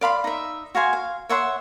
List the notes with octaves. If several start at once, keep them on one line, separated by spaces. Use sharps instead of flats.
D5 F5 B5 C6
D#4 E5
F#4 F5 G#5 C6
F5
C#5 E5 F#5 C6